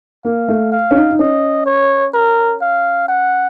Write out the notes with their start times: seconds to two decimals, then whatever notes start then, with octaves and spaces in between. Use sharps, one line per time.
0.25 A#3 F5
0.48 A3
0.72 F5
0.91 C#4
0.96 D#4
1.11 D#4
1.19 C#4 D#5
1.66 C#5
2.14 A#4
2.61 F5
3.08 F#5